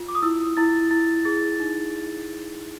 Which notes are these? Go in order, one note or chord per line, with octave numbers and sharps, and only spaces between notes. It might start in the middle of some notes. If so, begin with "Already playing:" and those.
Already playing: F4
D6
D#6
E4 E6
E4 A6
E4 A6
G#4 A6
D#4